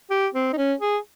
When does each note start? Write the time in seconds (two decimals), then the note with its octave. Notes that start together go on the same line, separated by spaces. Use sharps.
0.10 G4
0.34 C4
0.53 D#4
0.57 C#4
0.81 G#4